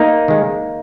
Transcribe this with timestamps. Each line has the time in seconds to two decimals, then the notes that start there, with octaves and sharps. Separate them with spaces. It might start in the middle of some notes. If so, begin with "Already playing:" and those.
Already playing: A#3 D#4
0.28 D#3 G#3